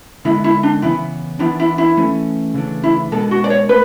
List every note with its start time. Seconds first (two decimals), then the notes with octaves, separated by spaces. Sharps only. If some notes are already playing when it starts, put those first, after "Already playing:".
0.25 D3 G#3 B3 E4
0.44 E4
0.63 D4
0.82 C#3 E3 B3 E4
1.39 E3 B3 D4 E4
1.60 E4
1.78 E4
1.97 E3 A3 C#4
2.54 C#3 E3 A3 D4
2.83 E4
3.11 B2 G#3 B3 D4 A4
3.31 F#4
3.44 D5
3.50 C#5
3.69 A3 B4